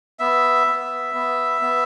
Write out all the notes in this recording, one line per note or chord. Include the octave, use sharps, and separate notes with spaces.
B3 E5
B3
B3
B3